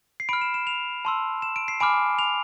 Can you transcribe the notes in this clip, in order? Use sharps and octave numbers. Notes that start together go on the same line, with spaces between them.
C7
B5 F6 D7
E7
E7
F7
A5 C6 E6
E7
D7
C7
G#5 B5 D6 F6 D7
F7